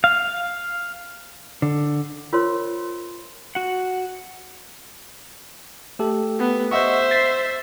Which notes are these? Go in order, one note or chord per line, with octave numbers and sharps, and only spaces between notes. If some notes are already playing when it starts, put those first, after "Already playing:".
F5
D3
F4 A#4 C5 C#5 C6
F#4 F#5
A3 G4 A4
B3
C5 D#5 E5 F#5 C#6
A6 B6 C7